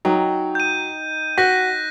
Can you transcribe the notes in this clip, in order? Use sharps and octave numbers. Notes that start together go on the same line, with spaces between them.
F#3 D#4 G5
G6 D#7
F#4 F#6 A#6 B6